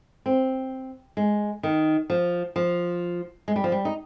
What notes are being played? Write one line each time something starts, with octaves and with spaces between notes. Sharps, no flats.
C4
G#3
D#3
F3
F3
G#3
G3
F3
G3
D#4